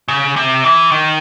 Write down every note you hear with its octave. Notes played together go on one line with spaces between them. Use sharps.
C#3
C3
E3
D#3